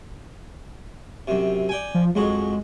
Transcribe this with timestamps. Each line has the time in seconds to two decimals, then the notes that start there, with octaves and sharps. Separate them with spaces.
1.28 F#2 C3
1.69 D5 G5 G#5
1.95 F3
2.15 F2 F#3 G#3 F#4